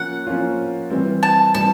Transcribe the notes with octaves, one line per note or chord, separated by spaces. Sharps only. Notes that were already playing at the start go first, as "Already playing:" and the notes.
Already playing: F3 A#3 C#4 F4 F#5
F3 A#3 C#4 F4
E3 G3 C4
A5
E3 G3 C4 A5